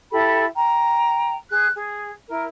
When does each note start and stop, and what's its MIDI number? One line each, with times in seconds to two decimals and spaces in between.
0.12 0.45 64
0.12 0.45 67
0.12 0.45 69
0.12 0.45 83
0.55 1.36 79
0.55 1.36 82
1.50 1.69 68
1.50 1.69 90
1.74 2.11 68
2.29 2.45 64
2.29 2.45 70